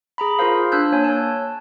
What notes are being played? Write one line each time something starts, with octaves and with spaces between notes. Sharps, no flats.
G#4 A#5 B5
F4 G#4 A#4 C5 F5
D4 E6 F#6 G6
A#3 C#5 G#5
C#5 A5